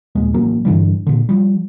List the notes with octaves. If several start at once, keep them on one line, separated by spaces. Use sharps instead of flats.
A#1 D#2 G#3
A1 F#3 A#3
G2 D3 E3 G3
A#2 D3
F3 G3